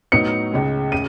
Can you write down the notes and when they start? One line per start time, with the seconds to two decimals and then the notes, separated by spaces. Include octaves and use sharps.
0.12 A2 F#3 B3 D#4 C#7
0.52 C#2 C#3 G#3
0.92 C#3 D#7